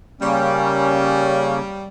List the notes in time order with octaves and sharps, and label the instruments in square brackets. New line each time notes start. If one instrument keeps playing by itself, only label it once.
[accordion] C#3 A#3 C#4 [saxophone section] G3